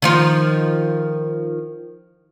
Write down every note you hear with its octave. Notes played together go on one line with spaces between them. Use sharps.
D#3 F3 F4